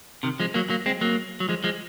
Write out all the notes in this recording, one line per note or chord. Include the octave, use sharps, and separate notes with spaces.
C3 D#3
F3 G#3
F#3 A#3
F#3 A#3
G#3 C4
F#3 A#3
F#3
F3 G#3
F3 G#3